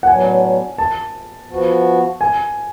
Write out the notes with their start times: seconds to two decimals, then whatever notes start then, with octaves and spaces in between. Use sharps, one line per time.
0.03 F#5
0.07 A2 F#3 B3 D4 G#5
0.78 A5
1.50 F3 B3 F#4
2.21 G#5